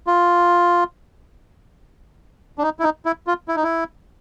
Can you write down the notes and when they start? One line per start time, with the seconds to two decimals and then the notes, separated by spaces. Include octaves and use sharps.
0.07 F4
2.58 D4
2.63 D#4
2.79 E4
2.83 D#4
3.05 E4
3.27 F4
3.48 E4
3.56 D#4
3.63 E4